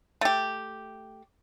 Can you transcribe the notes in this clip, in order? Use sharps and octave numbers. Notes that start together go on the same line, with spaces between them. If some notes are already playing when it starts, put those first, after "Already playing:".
A3 G4